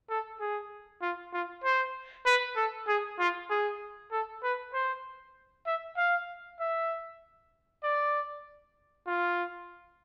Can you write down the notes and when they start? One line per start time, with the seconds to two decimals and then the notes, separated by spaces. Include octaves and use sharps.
0.10 A4
0.40 G#4
1.02 F4
1.33 F4
1.64 C5
2.26 B4
2.56 A4
2.87 G#4
3.19 F4
3.50 G#4
4.12 A4
4.43 B4
4.74 C5
5.67 E5
5.97 F5
6.60 E5
7.83 D5
9.07 F4